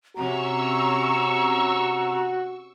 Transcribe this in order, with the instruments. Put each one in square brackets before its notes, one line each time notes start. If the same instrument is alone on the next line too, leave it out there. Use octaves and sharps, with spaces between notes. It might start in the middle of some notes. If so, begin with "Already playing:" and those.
[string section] C3 C#4 [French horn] F#4 [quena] A#5 [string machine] C#6 E6